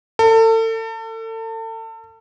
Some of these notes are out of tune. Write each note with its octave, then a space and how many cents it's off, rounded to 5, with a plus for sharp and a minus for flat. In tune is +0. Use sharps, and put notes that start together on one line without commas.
A4 +35